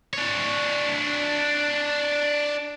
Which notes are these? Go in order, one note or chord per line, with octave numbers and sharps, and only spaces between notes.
D4 C#5